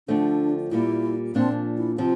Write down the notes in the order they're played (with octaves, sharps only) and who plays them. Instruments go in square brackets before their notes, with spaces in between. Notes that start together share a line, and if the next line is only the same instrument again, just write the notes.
[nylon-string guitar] D3 F3 A3 C4 [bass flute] D4
[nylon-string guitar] A#2 G3 A#3 [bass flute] E4
[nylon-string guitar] A#2 F3 A#3 D4 [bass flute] C4
[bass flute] E4
[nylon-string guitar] C3 F3 [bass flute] C4